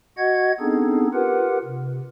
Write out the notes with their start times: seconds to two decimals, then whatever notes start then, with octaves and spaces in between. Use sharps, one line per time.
0.18 F#4 D#5 F#5 G#6
0.60 B3 C4 D4 D#4 G#4 A4
1.14 F4 G4 A#4 B4 F#5
1.64 C3